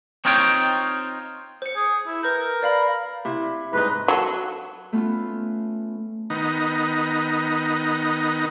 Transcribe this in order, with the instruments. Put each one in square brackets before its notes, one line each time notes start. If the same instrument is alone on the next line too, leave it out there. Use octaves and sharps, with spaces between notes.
[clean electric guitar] C4 D#4 F4 C#5 G5
[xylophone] C5 C#7
[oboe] G#4
E4
[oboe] A#4 [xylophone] B4 G6
[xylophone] D5 F5 B5
[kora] C3 E4
[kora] G#2 G3 D#4 [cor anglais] B4
[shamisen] F#3 A4
[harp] A3 B3 C#4 F4
[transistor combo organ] D#3 B3 D#4